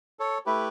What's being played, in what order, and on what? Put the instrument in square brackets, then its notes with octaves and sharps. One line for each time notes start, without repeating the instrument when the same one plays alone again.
[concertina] A4 C#5
A3 E4 G4 B4